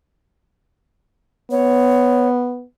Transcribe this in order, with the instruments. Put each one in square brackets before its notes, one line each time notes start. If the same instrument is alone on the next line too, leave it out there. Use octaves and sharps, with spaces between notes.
[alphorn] B3 [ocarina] C#5